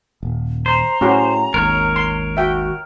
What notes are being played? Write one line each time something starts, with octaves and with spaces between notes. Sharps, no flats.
D#1
C5 A#5
A2 C#4 F#4 G4
G#1 D#2 A#4 C#5
C6
F#4 E5 G5